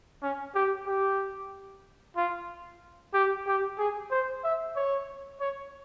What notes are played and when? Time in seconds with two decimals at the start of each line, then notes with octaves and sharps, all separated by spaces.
0.22 C#4
0.55 G4
0.87 G4
2.16 F4
3.14 G4
3.47 G4
3.78 G#4
4.11 C5
4.44 E5
4.76 C#5
5.40 C#5